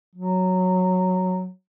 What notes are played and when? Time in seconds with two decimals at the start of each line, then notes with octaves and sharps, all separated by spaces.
0.16 F#3